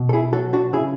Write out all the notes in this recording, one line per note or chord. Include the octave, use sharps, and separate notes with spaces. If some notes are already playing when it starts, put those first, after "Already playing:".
Already playing: B2
A4
E4 G#4
F#3 F#4 A4
D4 F#4
C#3 E4 G#4